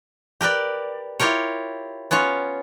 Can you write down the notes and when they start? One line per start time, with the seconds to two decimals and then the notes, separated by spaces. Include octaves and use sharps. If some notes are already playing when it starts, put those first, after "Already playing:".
0.41 G4 A#4 B4 D5
1.20 E4 F4 G4 A#4 C#5
2.11 B3 C#4 F4 C#5